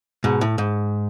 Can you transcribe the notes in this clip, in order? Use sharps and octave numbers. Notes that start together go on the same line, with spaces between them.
G#2 B2
A2
G#2